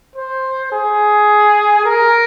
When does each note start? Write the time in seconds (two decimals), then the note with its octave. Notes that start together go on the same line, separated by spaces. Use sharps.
0.15 C5
0.72 G#4
1.85 A#4